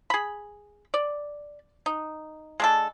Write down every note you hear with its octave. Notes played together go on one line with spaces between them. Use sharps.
G#4 B5
D5
D#4
G#3 D4 A4